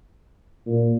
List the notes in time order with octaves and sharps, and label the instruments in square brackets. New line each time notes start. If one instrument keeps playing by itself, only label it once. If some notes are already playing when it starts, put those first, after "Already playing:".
[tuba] A#2